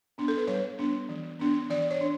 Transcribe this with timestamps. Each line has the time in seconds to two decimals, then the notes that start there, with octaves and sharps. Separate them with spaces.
0.18 B3 D4
0.28 A4
0.38 B4
0.47 G3 C#5
0.78 B3 D4
1.09 E3
1.39 B3 D4
1.70 E3 D5
1.91 C#5
2.01 D4